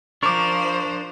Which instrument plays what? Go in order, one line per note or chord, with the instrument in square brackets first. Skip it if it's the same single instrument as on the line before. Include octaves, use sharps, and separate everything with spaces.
[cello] F3 C5 [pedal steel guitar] D4 A#4 [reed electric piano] C#6 D6